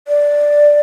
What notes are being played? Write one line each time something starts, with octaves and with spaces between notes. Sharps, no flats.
D5